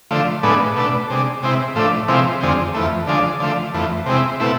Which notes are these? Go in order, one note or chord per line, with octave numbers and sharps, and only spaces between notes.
D3 F3 A3
A2 G#3 B3 D4
B2 A3 D4
C3 G#3 D4
C3 G#3 C4 E4
A2 F3 A3 D4
C3 F3 G#3 C4 E4
F2 D3 G#3 C4
F2 E3 A3
D3 F3 G#3 D4
D3 F3 A3
F2 E3 A3
C3 G#3 C4 E4
B2 A3 C4 E4